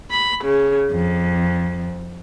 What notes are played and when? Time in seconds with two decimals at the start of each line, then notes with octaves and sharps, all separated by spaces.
0.11 B5
0.45 C#3
0.91 F2